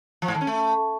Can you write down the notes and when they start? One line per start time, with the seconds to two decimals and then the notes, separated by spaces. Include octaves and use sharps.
0.22 F3
0.28 G#2
0.35 D#3
0.41 C#4
0.47 A3